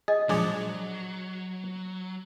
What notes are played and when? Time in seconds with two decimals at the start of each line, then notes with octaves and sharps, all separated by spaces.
0.08 G#4 D#5
0.29 A#2 F3 F#3 G#3 D4 G#4 D5